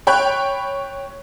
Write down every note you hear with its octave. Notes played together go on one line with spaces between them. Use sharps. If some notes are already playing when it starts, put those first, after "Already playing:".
C#5 G5 B5 C#6 F#6